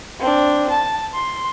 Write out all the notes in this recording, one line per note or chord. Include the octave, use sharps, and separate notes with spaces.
C4 D4
A5
C6